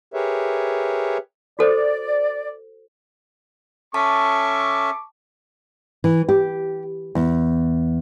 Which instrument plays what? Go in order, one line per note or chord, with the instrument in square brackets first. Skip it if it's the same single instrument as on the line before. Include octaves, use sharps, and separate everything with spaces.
[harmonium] G4 G#4 A#4 B4 C#5 E5
[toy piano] F#4 A4 C5 [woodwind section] D5
[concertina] C#4 A4 E5 [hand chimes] A5 [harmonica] C#6 D6
[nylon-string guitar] E3
G4
E2